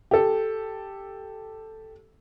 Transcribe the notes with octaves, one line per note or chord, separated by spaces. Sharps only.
G4 A4